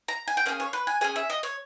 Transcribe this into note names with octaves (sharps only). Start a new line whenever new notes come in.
A#5
G#5
G5
A#3 C#4 G#4 G#5
C#5
B4
G#5
C#4 G#4 G#5
E5
D#5
C#5